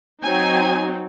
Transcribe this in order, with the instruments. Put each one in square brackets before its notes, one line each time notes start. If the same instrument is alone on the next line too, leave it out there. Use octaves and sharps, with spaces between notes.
[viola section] F#3 C4 D#4 G#5